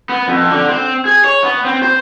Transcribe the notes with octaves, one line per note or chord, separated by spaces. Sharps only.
B3
F2
D3
C4
G#4
C#5
B3
C4
C5